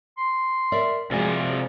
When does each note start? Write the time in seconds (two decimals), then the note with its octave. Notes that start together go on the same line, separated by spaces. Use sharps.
0.18 C6
0.72 A#4 D5 E5
1.11 C3 F3 G#3 F4 F#4 D5 G#5